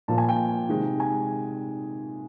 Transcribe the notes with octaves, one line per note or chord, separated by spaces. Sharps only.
A#2 F3 A#3 A5
G#5
G5
C3 D#3 G#3
G#5